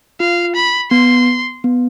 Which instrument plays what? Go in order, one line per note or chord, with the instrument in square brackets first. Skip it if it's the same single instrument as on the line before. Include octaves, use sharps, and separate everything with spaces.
[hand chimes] F4 [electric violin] F5
[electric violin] B5
[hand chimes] B3 [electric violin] C6
[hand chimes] B3